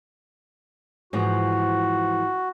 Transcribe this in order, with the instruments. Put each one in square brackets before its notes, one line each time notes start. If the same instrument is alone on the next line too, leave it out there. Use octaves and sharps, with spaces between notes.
[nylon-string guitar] G#2 E3 F3 [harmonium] F#4